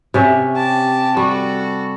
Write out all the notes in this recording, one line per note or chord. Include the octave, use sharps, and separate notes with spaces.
C3 C#4 E5
G4 A5
G3 F#4 A4